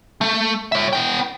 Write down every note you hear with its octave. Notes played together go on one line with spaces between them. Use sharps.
A3
C#5 E5
B3 G5